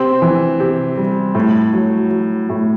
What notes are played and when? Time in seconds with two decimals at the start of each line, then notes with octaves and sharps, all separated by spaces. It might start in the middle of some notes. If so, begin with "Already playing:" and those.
Already playing: C3 C4
0.22 E3
0.60 C3
0.97 G3
1.35 A2
1.73 F#3
2.11 F#3
2.49 A2